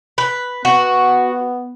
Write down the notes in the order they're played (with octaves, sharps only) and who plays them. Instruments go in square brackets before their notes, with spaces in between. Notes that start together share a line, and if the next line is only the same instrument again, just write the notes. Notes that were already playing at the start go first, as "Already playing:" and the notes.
[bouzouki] B4
[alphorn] B3 [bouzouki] F#4